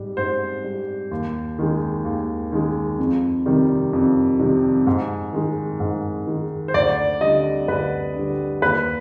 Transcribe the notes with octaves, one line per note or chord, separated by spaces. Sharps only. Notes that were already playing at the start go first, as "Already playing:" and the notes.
Already playing: G#2 G3
G#2 C5
G3
D#2
D#3 G#3
D#2
D#3 G#3
F2
C3 D#3 G3
F2
C3 D#3 G3
G#2
D#3 G#3
G#2
D#3 G#3
C5
D2 D5
D3 G3 D#5
D2 B4
D3 G3
D#2 B4